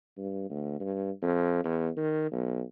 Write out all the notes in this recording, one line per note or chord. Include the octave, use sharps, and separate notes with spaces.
G2
D2
G2
F2
E2
D#3
B1